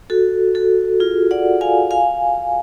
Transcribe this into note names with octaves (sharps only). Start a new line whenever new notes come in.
F#4 A4
F#4 A4
F4 G#4
D5 F#5
F5 G#5
F5 G#5